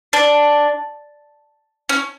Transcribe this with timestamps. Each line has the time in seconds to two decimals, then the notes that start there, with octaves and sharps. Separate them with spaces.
0.13 D4
1.89 C#4